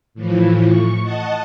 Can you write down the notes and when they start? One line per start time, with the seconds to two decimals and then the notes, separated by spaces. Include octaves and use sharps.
0.14 A2 E3 F3
0.65 C#6
1.02 D#5 F#5 A5